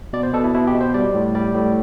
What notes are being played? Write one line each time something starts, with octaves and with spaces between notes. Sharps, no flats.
B2 D5
C5
B2 A4
E4
B2 E4
G4
B2
C5
G3 D5
A2
G3 D5
A2